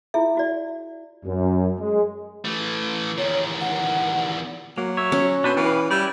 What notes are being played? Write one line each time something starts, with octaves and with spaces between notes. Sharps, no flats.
E4 F4 G#4 E5
E4 F#4 D5
F#2
G#3
E3 A3
E2 D#3 C#5
F#5
F#3 A#3
C#5 E5
C#4
B2 D4 B4 C5
E3 G4 B4 F5
G3 E4 B4 D5